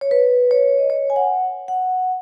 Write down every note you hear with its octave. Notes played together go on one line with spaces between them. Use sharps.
C#5
B4
C#5
D#5
C#5
G#5
F#5
F#5